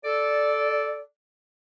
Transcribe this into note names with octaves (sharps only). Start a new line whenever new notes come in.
A4 D5